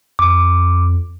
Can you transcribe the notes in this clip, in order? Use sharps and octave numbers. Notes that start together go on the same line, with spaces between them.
F2 D6